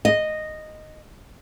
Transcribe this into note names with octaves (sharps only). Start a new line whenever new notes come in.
D#5